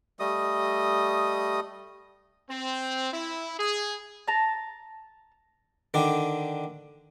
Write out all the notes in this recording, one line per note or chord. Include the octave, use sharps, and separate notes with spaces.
G3 A3 D#5 D#6
C4
E4
G#4
A5 A#5
D3 D#3 D4